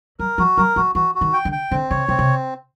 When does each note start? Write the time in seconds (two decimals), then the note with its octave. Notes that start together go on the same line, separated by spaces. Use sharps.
0.19 F#3 A#4
0.38 F3 F#4
0.58 F#3 A#4
0.76 F3 F#4
0.95 E3 F#4
1.15 F#4
1.21 D#3
1.33 G5
1.45 D3
1.52 G5
1.71 D3 C4
1.90 C#3 C#5
2.09 C3 C4
2.19 C3